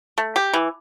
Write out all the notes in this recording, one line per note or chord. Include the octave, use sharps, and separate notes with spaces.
A3
G4
E3